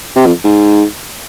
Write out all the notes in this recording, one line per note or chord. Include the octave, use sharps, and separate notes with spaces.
C3
F2
G#2